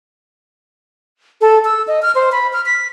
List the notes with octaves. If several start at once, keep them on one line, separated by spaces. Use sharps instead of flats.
A4
E6
D#5
F6
C5
B5
F6
B6